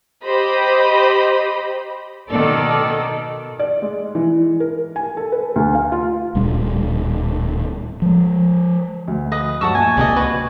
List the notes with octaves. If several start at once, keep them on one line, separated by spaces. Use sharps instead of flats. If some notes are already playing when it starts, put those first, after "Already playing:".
G4 C5 D#5 B5
B2 D#3 A4 D5
D5
G#3
E3
A#4
G#5
A4
B4
D2
F5
F4
D1 A#2 G3 D4
F3 G#3
D2
B4 D#5 D#6
G2 F#3 F#4 F#5 A5 C#6 E6
A#1 G#5 A5
C#2 C3 D5 D#5
F#4 B4 C#6